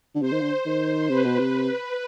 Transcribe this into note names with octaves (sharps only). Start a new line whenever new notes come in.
D3
C3 C5
D#3
D3
C5
D#3
C5
C3 B4
B2
C3